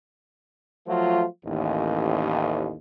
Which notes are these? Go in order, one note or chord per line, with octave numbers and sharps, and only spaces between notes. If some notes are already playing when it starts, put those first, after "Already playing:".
F3 F#3 A3 F4
A1 D#2